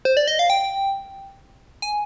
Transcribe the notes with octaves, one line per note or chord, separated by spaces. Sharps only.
C5
D5
D#5
F5
G5
G#5